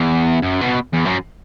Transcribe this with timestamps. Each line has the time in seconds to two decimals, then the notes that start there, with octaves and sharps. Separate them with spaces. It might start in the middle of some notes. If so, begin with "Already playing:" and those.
Already playing: E2
0.42 F#2
0.61 B2
0.93 E2
1.05 F#2